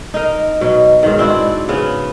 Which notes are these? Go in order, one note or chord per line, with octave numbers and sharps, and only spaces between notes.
D#4 A#4
B2 F#3
G#2 D#3
C4 D4 E4 F#4
C#3 B3